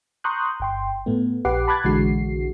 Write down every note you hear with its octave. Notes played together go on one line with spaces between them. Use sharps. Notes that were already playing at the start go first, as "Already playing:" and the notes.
A#5 C6 C#6 D#6 F#6 G6
G1 G5 C6
A2 A3 B3
A#1 G4 B4 F#5 D6 C7
A5 B5 D6 F#6 G#6 A6
A#1 D3 E3 G#3 F#4 C7